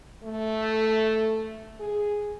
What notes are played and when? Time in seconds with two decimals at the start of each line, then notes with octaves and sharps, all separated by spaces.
0.23 A3
1.80 G#4